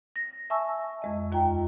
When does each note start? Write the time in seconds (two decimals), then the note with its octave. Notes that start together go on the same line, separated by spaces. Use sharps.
0.16 A#6
0.50 E5 G#5 A5 C#6 E6
1.02 F2 G#3 D#5
1.32 D#2 F4 G5 A#5